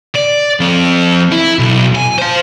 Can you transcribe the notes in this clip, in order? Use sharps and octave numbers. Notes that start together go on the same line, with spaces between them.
D5
F3 C4
E4
B1
G#5
C5 F5